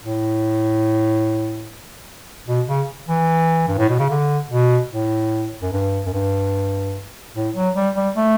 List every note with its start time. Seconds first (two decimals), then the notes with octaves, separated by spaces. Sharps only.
0.03 A2
2.47 B2
2.67 C#3
3.08 E3
3.68 G2
3.78 A2
3.89 B2
3.99 C#3
4.10 D3
4.50 B2
4.91 A2
5.62 F#2
5.72 G2
6.06 F#2
6.13 G2
7.35 A2
7.56 F#3
7.76 G3
7.96 G3
8.16 A3